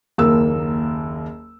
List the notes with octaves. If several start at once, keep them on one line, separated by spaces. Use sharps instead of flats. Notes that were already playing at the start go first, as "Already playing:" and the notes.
F#1 D#2 A#3 E6